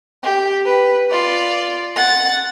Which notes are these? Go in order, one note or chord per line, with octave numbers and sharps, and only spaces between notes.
G4
B4
F4 D5
F#5 A6